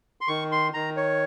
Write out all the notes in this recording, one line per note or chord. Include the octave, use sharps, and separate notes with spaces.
C6
D#3 C#6
C6
D#3 A#5
C#5